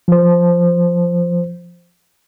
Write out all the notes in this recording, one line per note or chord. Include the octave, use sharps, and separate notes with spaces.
F3 C5